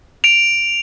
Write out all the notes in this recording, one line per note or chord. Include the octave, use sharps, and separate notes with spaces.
D7 F7